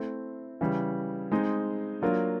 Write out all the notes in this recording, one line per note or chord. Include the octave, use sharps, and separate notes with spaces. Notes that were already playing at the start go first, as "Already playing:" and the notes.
Already playing: A3 C4 E4
C#3 E3 G3
G#3 C4 D#4
F#3 A#3 D4 F4